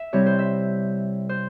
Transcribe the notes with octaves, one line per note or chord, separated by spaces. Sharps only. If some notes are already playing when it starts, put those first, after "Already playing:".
Already playing: E5
C3 G3 C4 E4 C#5
C5
E5
C5